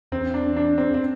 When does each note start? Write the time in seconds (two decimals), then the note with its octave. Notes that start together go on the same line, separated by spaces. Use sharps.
0.12 E2 C4
0.34 D4
0.56 D4
0.78 C4
0.94 C4